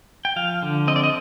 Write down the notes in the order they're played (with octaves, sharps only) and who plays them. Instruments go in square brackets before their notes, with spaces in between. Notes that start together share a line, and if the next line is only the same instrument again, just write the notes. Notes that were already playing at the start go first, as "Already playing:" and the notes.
[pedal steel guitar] G5
F3 F5
D3
C4 D#5
D5
D#5